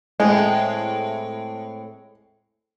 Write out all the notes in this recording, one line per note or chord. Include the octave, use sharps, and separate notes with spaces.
A2 G#3 C4